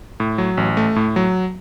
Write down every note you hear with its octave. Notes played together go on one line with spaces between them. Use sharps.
A2
F#3
A1
A3
A2
F#3